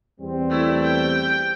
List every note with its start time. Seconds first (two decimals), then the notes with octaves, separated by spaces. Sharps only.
0.20 E2 G3 C4
0.50 A3 E4
0.83 G5